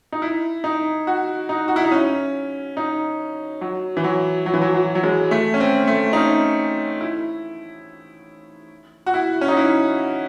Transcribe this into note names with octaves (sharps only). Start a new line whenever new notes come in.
D#4
E4
D#4
F#4
D#4
F#4
E4
D#4
C#4
D#4
F#3
E3
F#3
F#3
E3
F#3
F#3
F#3
G#3
A3
C#4
C4
A3
D#4
C#4
E4
F#4
E4
C#4
D#4
E4